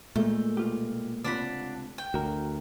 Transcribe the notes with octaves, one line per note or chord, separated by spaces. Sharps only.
A#2 G#3 A3 G6
B2 F4 G4
C#2 C3 D4 F4 F#5 B5
G5
D2 F#4 A#4